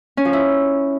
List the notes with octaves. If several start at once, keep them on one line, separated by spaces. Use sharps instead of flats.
C#4
F3
E4